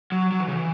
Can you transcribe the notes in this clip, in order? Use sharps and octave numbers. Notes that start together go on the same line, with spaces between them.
F#3
F#3
E3
C#3
E3